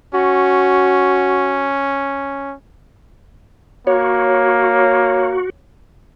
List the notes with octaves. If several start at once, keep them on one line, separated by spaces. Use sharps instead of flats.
C#4 F#4
A#3 F#4 C#5